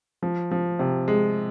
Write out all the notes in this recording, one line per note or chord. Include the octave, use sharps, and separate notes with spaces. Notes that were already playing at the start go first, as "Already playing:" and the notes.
F3
F3
C3
G#3